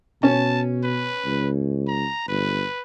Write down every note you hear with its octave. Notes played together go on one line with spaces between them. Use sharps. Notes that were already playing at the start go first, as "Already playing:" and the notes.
B2 C#4 A5
B4
C#2
A#5
G1 B4